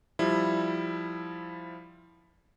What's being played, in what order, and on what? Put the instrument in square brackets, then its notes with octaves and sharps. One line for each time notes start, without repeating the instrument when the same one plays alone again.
[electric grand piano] F3 G3 E4